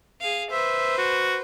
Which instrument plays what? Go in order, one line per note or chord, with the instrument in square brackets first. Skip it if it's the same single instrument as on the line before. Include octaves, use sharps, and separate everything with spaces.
[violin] G#4 F5
[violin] B4 C5 [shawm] E5
[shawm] F#4